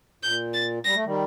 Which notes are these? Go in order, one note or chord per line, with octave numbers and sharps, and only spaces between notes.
A#2 G6
A6
G3 A#6
A3
D#3 G3